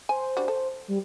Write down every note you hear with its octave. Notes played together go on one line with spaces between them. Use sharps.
C5 G#5
G3 D4 F#4
A4
G3